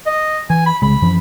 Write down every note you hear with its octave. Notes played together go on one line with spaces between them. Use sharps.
D#5
E3 G#5
B5
C2 C#3 G#3 B5
F#2 E3 F3